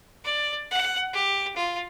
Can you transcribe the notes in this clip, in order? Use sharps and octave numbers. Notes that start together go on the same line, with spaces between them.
D5
F#5
G4
F4